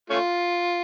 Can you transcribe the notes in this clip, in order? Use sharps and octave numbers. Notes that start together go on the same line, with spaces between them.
A3 C#4 F4